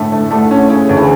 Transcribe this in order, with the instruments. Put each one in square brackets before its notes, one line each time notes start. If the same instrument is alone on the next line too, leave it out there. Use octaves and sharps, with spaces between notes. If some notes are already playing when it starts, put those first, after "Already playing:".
Already playing: [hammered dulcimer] A2 [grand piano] D3 A3
[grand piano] A3
[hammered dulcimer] D3 [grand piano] A3
[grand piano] C#4
[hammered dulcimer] C#3 [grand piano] C#4
[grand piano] D2
[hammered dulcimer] E3